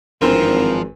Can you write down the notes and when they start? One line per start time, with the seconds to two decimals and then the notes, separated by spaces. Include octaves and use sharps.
0.22 G#1 G2 E3 F3 C4 A#4